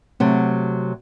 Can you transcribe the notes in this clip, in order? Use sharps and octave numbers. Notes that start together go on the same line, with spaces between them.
C3 F#3 A3